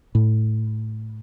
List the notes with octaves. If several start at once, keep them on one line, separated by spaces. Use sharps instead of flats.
A2